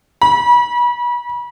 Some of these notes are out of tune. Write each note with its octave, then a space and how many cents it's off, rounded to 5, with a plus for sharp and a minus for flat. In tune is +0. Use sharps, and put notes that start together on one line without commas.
B5 -35